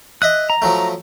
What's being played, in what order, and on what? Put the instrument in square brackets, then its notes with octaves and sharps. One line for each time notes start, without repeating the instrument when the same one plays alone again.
[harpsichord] D#5 E5 D#6 [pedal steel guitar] F#6
[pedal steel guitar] A#5
[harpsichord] F3 F#3 A3